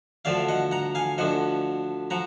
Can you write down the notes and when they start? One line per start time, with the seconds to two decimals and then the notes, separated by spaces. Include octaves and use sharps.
0.25 D2 D3 F3 D5 F5
0.49 D#5 F#5
0.71 F#5 A#5
0.95 F5 G#5
1.18 D2 D3 F3 D#5 F#5
2.10 F3 F#5 A#5